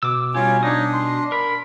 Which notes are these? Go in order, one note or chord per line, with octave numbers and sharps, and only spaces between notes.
B2 D6 E6
G3 C#4 F4 G4 G#5
D4 D#4 D#6
C6
A#4 B5